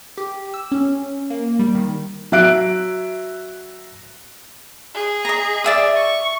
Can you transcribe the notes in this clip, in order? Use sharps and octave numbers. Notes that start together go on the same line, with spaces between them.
G4
E6
C#4
A#3
G3
D#3
F#3 E5 F#6 D7
G#4
D#5 A#5
D5 E5 D#6
C#6